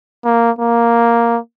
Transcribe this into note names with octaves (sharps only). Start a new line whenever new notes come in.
A#3
A#3